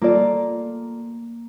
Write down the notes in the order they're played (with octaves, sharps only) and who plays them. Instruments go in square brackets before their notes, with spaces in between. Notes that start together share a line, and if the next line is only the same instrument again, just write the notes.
[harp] A#3 [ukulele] F4 A4 D5